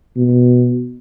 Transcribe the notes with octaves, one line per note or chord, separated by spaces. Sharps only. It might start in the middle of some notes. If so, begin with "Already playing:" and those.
B2